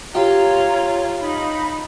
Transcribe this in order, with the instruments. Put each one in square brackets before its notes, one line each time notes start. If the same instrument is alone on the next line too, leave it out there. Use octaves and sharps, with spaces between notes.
[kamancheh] F4 [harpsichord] G4 [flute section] C#5 A#5
[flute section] D#4 B5